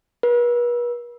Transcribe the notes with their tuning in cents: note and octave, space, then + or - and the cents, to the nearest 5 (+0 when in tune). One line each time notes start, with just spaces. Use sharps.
B4 -40